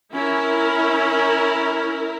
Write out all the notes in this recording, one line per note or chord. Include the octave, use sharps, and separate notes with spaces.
C#4 E4 A#4